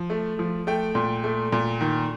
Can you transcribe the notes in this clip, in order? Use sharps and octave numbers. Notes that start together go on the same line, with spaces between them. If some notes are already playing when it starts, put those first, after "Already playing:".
Already playing: F3
A3
F3
A3 G5
A#2
A3
A#2
D#3